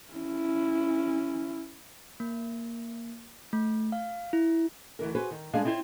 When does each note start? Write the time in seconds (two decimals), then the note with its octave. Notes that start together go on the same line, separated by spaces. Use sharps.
0.13 C#4 E4
2.20 A#3
3.53 A3
3.92 F5
4.33 E4
4.99 D2 E3 A#4
5.15 F#4 G#4 B4 C5
5.31 D#3
5.54 G3 G#3 D4 G#4 D5 F5
5.65 C4 E4 F4 C5 C#5